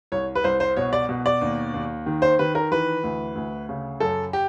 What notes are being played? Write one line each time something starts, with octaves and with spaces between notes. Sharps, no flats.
C2 C#5
B4
C2 C5
C5
B2 C#5
D5
B2
D5
D#2
D#2
D#3
C5
D#3 B4
A#4
E3 B4
D2
D2
C#3
F#2 A4
G4